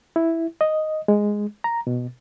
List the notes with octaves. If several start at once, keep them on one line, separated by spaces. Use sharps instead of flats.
E4
D#5
G#3
A#5
B2